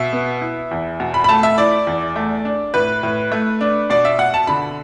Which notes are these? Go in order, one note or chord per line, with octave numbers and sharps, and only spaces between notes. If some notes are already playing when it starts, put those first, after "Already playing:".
Already playing: B2 E5
B3
E4
E2
B2
B5
B5
A3 A5
E5
E4 D5
E2
A3
D4
A2 B4
A2
A3
D4
B2 D5
E5
B2 F#5
A5
D3 B5